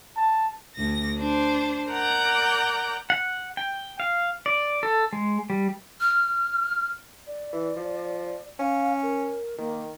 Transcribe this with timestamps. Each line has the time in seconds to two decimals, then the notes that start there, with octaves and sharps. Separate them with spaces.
0.17 A5
0.76 D2 A#6
1.19 D4 C5
1.90 A#4 D5 F#5 A#5 G6
3.10 F#5
3.57 G5
4.00 F5
4.46 D5
4.83 A4
5.13 G#3
5.50 G3
6.01 F6
7.27 D5
7.53 E3
7.76 F3
8.59 C#4 F5
9.03 A#4
9.58 D#3 A#3